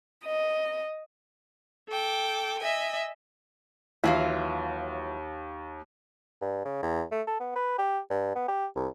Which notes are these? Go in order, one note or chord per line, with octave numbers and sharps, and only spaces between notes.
D#5
A4 G5 D6
D#5 E5 G#5
D#2 E3 F#3 F4
G2
C#3
E2
A3
A4
B3
B4
G4
G2
B3
G4
C2